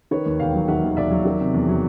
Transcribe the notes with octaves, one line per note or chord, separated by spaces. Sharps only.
D#3 B4 C#5
D#2
E1 F5 G5
F#3
D#3 E5 F#5
D#2
E1 D5 E5
F#3
D#3
C3
E2
F#3